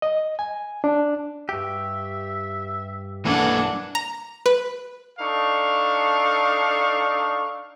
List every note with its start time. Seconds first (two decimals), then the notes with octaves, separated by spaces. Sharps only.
0.02 D#5
0.39 G#5
0.84 D4
1.49 G2 G4 E5
3.25 B1 G2 E3 A#3 D4 A4 F#5 G#5
3.95 A#5
4.46 B4
5.19 D4 D#4 A4 F5 C#6